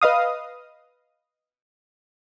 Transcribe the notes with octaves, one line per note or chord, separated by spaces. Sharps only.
B4 D#5 F5 D#6